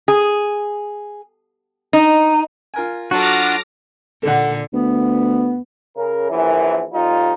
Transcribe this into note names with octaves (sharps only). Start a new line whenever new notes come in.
G#4
D#4
F4 A#4 G#5
F#3 D4 F4 F#4 A4 D6 F6 A#6
A#2 D3 A4 F#5
D2 B3
C#3 A#4
A#1 F#2 E3
F2 G3 D#4 F4